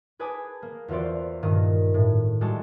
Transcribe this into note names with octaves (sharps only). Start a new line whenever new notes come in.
G#4 B4 G#5 A5 D6 D#6
A#3
E2 E3 F4 F#4 C5 D5
G2 A#2 D#3 D#5 D#7
A2
G3 G#3 D4 F#4 A5